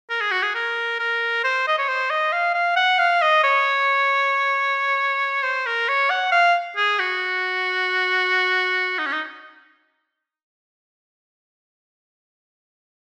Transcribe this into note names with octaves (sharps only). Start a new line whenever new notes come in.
A#4
G#4
F#4
G#4
A#4
A#4
C5
D#5
C#5
C5
D#5
F5
F5
F#5
F5
D#5
C#5
C5
A#4
C#5
F#5
F5
G#4
F#4
D#4
C#4
D#4